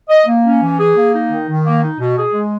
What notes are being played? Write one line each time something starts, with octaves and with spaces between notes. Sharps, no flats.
D#5
A#3
C#4
E3
G#4
A#3
D#4
D#3
D#3
A#3
D#4
B2
G#4
G#3